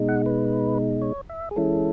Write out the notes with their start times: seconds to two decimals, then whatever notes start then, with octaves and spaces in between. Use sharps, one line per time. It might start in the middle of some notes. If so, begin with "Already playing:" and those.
Already playing: B2 G#3 D#4
0.09 F#5
0.26 B4
1.02 C#5
1.29 E5
1.51 G#4
1.56 E3 G#3 C#4 E4 A4